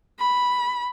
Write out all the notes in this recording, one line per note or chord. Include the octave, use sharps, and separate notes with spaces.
B5